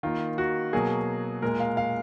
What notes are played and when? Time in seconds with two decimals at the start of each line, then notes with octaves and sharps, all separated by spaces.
0.03 D#3 A#3 F4
0.38 F#4
0.73 B2 F#3 A#3 G#4
1.42 A#2 G#3 A#4
1.60 F5
1.77 F5